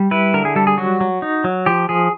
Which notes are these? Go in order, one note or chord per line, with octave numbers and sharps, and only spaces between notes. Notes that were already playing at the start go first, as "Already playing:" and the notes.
Already playing: G3
E4 B4
D3 A#4
G#4
G3 A4
G#4
F#3 F#4
F#3
D#4
F#3
F3 G4
F3 G#4